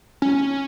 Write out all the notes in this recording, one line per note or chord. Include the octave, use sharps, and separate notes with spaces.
C#4